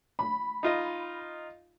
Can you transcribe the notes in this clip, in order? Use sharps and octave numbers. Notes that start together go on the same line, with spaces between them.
B5
D#4 F4 D#5